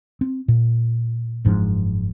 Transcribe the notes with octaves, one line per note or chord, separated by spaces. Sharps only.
C4
A#2
F#1 G#2 F3 D4